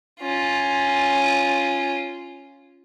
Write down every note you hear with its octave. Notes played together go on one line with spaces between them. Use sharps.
C#4 F4